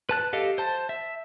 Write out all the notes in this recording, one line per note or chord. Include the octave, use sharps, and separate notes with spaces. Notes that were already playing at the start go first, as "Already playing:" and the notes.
B4 A5 F#6
G4 A4 D#5 F5
C5 A5
E5